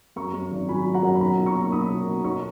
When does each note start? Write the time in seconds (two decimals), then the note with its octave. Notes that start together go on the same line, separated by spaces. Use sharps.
0.16 F#2 A#5 C#6
0.33 F#2
0.51 G#1
0.68 F#3 G#5 B5
0.86 F#3
0.94 F#5 A#5
1.03 F#2
1.15 B5
1.21 B1 F#5 A#5
1.37 B1
1.46 A#5 C#6
1.55 A#3
1.65 C#6
1.72 B1 B5 D#6
1.90 B1
2.07 B2
2.24 B1 A#5 C#6